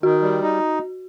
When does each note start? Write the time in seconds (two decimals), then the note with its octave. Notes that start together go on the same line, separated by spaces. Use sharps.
0.03 D#3 F#4
0.22 G3
0.42 D#4